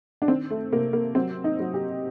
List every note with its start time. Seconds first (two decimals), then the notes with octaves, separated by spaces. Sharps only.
0.22 D4
0.28 D#3 C4
0.50 A3
0.72 C3 A#3
0.93 A#3
1.15 F#3 C4
1.44 D#4
1.60 F#3
1.74 G4